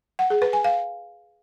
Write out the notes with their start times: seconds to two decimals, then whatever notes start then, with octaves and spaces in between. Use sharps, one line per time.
0.19 F#5
0.30 G#4
0.42 B4
0.53 G#5
0.64 F5